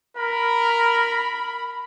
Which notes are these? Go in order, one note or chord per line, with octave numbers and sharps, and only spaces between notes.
A#4 B5